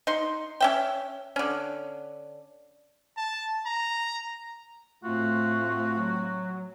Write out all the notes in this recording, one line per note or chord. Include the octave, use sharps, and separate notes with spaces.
D#4 C6
C#4 E5 G5
D3 C#4
A5
A#5
A2 A3 C4 F4 F#4
F#3